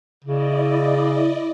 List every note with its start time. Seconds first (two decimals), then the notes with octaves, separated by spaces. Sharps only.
0.24 C#3 E4 D5 D#5